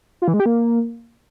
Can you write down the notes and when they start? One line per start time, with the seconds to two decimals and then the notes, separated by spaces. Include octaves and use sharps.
0.22 F4
0.28 E3
0.34 G#3
0.40 G4
0.46 A#3